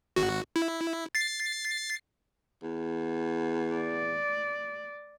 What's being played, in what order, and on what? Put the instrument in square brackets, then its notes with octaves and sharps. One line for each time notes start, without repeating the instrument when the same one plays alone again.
[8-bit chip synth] G#1 F#4
E4
A6 C7
[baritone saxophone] E2
[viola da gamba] D5